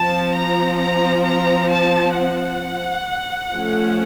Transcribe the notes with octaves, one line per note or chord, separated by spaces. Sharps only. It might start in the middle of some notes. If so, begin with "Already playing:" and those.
Already playing: F3 C4 A5
A#5
A#5
A#5
A5
F#5
F3 A3 C#4